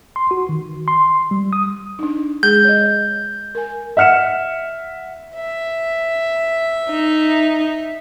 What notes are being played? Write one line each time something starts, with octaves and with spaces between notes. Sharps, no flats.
C6
F#4
D#3
C6
G3
D#6
D4 D#4
G#3 G#4 G6
C#5 D#5
A#4 G#5
E5 F#5 F6 C#7 E7
E5
D#4